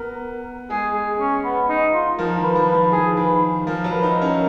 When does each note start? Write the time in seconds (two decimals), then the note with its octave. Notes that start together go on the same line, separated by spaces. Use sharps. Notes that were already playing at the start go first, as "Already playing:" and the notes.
Already playing: B3 A#4
0.70 G#3 G#4
0.95 G#4
1.19 C#4
1.44 B3
1.69 D#4
1.93 F4
2.18 F3 A#4
2.37 D#3
2.43 B4
2.55 F3
2.67 B4
2.74 F3
2.92 D#3 G#4
3.17 D#3 B4
3.66 F3 A#4
3.84 F#3
3.91 B4
4.03 D#4
4.16 A#4
4.21 C#4